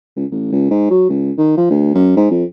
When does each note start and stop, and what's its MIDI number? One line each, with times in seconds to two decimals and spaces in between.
0.16 0.25 37
0.31 0.48 33
0.52 0.66 37
0.71 0.87 44
0.90 1.07 54
1.09 1.31 37
1.38 1.54 51
1.57 1.67 53
1.70 1.93 38
1.94 2.13 42
2.16 2.28 44
2.31 2.44 41